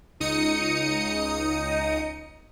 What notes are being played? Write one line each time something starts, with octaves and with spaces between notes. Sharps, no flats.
C#2 D#4 D#6 C#7